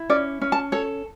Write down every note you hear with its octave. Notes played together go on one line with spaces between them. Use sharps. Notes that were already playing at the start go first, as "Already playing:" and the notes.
Already playing: E4
C#4 D5
C#4
A5
A4 C#5